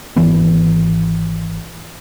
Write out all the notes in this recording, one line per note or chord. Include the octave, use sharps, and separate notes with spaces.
G#1 E3 B3